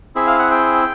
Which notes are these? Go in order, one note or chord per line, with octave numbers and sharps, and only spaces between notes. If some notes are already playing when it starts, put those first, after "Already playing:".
C4 E4 G#4 E5
F5
F#5
G5